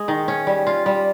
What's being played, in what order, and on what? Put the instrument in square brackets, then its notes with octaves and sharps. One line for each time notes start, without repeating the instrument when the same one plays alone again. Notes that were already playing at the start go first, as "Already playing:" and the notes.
Already playing: [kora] G#3
D#3
C#4
G3
F4
G3